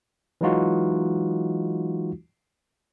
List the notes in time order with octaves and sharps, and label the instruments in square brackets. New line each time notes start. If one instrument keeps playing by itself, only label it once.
[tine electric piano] E3 F#3 G#3 D#4 F4 F#4